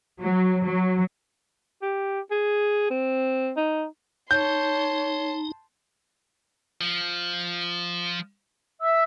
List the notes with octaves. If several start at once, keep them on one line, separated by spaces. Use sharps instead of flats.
F#3
F#3
G4
G#4
C4
D#4
D#4 C#5 A5 C6 G6
F3
E5 E6